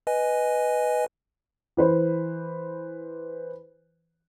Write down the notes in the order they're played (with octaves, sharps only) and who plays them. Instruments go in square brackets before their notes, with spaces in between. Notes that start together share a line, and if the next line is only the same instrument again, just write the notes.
[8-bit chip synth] B4 D#5 G#5
[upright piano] E3 B4 C5